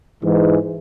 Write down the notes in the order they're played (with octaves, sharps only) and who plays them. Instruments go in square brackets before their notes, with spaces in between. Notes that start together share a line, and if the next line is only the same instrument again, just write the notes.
[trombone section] G#2 E3